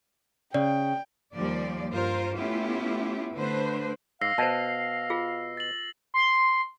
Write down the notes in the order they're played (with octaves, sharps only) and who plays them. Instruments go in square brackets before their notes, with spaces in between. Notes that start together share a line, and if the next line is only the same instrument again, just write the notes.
[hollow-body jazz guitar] C#3 [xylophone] D5 [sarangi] G5
[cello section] D#2 F3 G3 A#3 D5
G2 F4 A#4 C5
A3 B3 C#4 E4 F4 G4
D3 A3 D4 B4 C5
[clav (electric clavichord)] G#2 [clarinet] F5 [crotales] E6 A#6 C7
[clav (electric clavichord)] B2 [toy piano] C5 A5
[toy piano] F4 G#4
[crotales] A6 F#7
[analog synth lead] C6